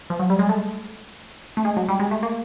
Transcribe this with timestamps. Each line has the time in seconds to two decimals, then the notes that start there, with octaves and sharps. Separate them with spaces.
0.10 F3
0.19 F#3
0.30 G3
0.39 G#3
0.49 A3
1.57 A3
1.65 G#3
1.77 F#3
1.88 G3
2.00 G#3
2.11 A3
2.23 A#3